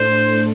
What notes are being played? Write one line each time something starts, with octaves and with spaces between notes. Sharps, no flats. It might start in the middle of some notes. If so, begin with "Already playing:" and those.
Already playing: A2 A3 D4 A4 C5